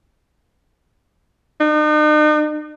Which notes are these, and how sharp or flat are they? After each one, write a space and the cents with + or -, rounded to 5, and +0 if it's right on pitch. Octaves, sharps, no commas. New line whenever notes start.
D#4 -45